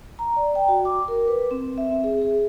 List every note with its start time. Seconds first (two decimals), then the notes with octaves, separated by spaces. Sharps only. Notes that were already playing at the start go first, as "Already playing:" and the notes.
0.19 A#5
0.36 D5
0.55 G5
0.68 F#4
0.85 D6
1.08 A#4
1.28 B4
1.51 C4
1.78 E5
1.90 C4
2.04 G#4
2.22 G#4